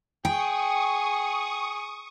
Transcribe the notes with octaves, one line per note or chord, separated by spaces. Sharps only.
G#4 G5 C#6 D#6